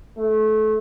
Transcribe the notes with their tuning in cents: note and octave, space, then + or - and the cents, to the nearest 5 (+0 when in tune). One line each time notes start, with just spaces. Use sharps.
A3 -25